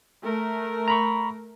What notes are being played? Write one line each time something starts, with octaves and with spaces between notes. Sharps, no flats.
A3 A#4
A#5 B5 C#6